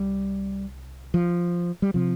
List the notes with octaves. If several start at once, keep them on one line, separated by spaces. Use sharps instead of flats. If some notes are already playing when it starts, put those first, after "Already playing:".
Already playing: C2 G3
F3
G3
C3 F3